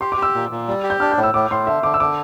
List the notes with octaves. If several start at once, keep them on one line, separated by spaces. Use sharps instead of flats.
G4 C6
D6
G4
E6
A#2
A#2
G3
G4
G6
D4 F6
G6
A2
E6
A2 D6
A2 C6
D3 E5
D3 D6
E6
D3 D6